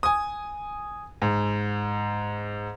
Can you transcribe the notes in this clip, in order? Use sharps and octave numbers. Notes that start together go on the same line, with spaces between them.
G#5 D#6
G#2